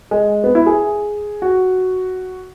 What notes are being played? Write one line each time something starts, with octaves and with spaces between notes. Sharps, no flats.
G#3
B3
E4
G#4
F#4